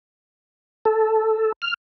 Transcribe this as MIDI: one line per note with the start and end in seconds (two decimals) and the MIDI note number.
0.85 1.52 69
1.62 1.74 89